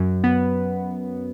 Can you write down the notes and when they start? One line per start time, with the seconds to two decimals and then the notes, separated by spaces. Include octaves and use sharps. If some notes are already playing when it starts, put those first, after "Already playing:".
Already playing: F#2
0.24 B3